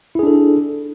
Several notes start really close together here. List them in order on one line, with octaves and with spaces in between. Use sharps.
E4 G#4 D4 A4